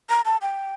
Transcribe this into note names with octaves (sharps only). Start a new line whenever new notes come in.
A#5
A5
G5